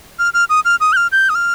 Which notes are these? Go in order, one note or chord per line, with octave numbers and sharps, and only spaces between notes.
F6
F6
D#6
F6
D#6
G6
F6
G6
D#6
F6